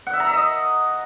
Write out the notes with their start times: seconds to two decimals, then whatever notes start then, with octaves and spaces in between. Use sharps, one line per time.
0.07 F#5
0.13 E5
0.20 A#5
0.27 E5
0.33 D#5